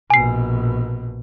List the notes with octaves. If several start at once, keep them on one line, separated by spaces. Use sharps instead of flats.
A#1 B2 G#5 C7